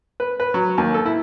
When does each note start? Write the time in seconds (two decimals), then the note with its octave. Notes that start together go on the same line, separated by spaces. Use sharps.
0.20 B4
0.40 B4
0.54 F#3
0.78 D#2
0.94 A4
1.06 E4